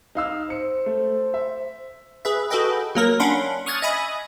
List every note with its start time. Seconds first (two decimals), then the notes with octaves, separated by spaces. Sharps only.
0.15 D#4 F5 E6
0.50 C5 C#7
0.86 A3
1.34 E5
2.25 G#4 B4 E5
2.50 F#4 G#4 A4 B4 D#5 G5
2.95 F#3 A#3 A#4
3.20 C#4 D4 F5 F#5 B5 C6
3.66 C#6 D#6 F6 F#6 G#6 A6
3.82 D#5 E5 G#5 B5 D#6